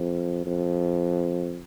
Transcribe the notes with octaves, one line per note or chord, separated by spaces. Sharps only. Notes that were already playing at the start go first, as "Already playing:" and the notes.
Already playing: F2
F2